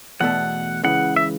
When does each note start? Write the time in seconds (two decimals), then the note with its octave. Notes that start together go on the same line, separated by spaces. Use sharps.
0.20 E2 B2 A3 F#5
0.83 C#2 C#3 E3 F#5
1.16 E5